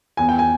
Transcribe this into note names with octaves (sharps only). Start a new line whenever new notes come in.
E2 G#5
G5
G#5